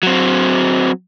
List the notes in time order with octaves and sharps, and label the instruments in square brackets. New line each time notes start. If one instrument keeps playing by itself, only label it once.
[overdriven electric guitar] F#3 C4